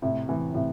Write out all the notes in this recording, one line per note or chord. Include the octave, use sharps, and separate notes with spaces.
A2 C3
C3 E3
A2 C3